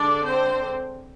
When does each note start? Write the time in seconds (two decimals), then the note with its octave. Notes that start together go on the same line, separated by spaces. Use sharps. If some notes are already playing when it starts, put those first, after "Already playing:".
Already playing: D3 G#3 D4 D5
0.24 C4 C5